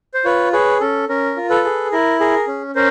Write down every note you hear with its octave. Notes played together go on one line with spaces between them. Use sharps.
C5
F4 B4 C#5
G#4 B4 C#5
C#4 A4
C#4 A#4
F4
A4 B4
G#4
E4 A#4
G#4 A#4
C#4
C#4 A#4 C5